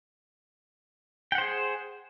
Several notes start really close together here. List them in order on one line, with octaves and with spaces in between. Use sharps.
G5 F#5 C5 G#4